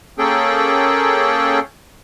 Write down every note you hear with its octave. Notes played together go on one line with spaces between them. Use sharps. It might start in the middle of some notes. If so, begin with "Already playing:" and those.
A#3 C#4 G#4 A4 G5